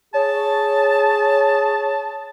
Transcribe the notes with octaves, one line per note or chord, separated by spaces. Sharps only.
G#4 C#5 A5